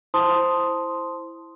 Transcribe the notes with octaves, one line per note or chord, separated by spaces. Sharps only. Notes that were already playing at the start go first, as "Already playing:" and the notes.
E4 C5 A5 C6 D#6